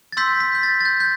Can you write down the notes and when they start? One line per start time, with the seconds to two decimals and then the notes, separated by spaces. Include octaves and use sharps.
0.12 A6
0.17 C6 E6 G6 B6
0.40 B6
0.55 G6
0.63 A6
0.80 A6
0.85 G6
1.00 G6